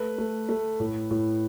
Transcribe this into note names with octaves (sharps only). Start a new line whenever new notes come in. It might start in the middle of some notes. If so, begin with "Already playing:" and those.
Already playing: A3 B4
A3
A3
A2
A2